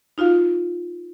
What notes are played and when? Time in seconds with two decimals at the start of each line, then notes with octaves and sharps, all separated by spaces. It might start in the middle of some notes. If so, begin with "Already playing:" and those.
0.18 D#4 F4 F#4 F5